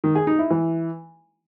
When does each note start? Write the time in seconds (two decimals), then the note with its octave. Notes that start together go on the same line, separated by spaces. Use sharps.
0.04 D#3
0.15 G#4
0.27 D#4
0.39 E4
0.50 E3